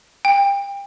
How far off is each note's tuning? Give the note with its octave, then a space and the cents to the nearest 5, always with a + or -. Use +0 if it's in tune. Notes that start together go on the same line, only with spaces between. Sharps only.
G5 +30